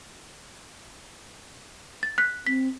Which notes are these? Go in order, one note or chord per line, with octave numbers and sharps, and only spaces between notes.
A6
F#6 B6
C4 B6